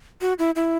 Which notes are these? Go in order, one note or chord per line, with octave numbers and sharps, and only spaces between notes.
F#4
E4
E4